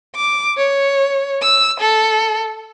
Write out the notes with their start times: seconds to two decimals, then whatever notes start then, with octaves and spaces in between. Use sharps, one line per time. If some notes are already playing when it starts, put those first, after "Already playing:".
0.16 D6
0.57 C#5
1.42 E6
1.81 A4